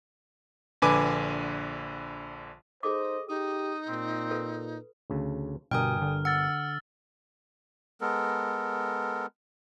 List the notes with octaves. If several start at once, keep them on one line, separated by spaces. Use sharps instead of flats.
A#1 D3 B4 G#5 D6
D#4 G#4 A4 C5 D#5 D6
D#4 G4 D#6
A#2 C4
F4 A4 B4
D2 C#3 A4
G1 G2 B2 A#4 G5 G#5 D#6 F6
D3
F#5 E6 F6 A6
G#3 B3 A4 A#4